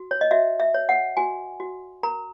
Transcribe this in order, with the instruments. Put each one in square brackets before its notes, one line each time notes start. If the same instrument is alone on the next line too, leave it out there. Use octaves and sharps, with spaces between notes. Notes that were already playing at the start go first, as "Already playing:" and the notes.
Already playing: [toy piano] F#4
C#5
D#5
F#4 E5
E5
C#5
F#5
F#4 G#5
F#4
A#4 A#5